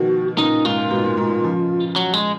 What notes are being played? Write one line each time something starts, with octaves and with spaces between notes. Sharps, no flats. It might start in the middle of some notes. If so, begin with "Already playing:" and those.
Already playing: B2 D#3 F3 F#4
A#2 C#3 D#4
G#2 F4
A#2
G#2 B2
A#2
G#2
A#2
C#3 F3
F#3
G#3